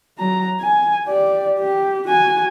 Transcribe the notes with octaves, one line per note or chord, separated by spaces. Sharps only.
F#3 A#5
G#5
G4 D5
G4
F#4 G#5